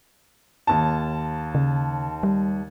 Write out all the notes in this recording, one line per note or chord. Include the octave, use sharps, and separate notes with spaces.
D#2 A5
C#3
G3